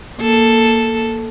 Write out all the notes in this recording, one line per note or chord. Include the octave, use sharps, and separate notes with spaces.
A#3 A4